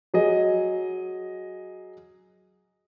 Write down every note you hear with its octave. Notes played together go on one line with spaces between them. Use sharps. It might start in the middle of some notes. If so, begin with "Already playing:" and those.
F#3 G#4 D#5